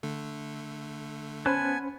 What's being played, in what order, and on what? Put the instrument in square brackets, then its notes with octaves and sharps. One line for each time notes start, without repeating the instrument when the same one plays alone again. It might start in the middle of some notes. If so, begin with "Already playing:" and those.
[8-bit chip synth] D3 A3
[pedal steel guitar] B3 A5 F#6 [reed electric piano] C#4 C5 B5 [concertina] G#5